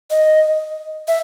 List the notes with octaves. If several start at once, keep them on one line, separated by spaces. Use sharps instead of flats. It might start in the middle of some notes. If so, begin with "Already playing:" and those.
D#5
E5